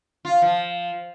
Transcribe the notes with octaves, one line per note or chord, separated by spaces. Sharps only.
F4
F3